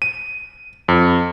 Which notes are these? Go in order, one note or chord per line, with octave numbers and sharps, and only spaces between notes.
D#7
F2